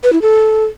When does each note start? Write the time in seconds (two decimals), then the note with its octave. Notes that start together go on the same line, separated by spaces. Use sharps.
0.04 B4
0.13 E4
0.22 A4